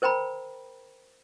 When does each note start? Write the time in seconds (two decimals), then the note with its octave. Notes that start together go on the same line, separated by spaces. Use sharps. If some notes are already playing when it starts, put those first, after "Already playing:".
0.02 A#4 C5 G5 A#5 B5